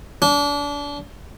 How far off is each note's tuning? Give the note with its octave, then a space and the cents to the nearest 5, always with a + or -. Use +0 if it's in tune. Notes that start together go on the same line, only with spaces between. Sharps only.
D4 -30